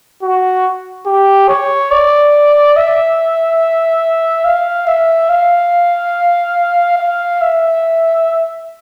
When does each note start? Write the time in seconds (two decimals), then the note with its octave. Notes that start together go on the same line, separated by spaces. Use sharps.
0.22 F#4
1.06 G4
1.48 C#5
1.91 D5
2.76 E5
4.44 F5
4.88 E5
5.29 F5
6.99 F5
7.41 E5